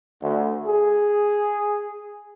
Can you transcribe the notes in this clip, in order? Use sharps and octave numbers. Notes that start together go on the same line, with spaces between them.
D2
G#4